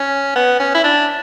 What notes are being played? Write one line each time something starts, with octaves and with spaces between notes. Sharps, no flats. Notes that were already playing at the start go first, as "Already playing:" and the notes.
Already playing: C#4
B3
C#4
E4
D4